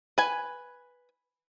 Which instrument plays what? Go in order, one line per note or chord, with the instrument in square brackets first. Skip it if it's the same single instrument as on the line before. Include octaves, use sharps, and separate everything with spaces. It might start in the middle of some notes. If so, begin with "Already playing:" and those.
[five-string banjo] B4 G#5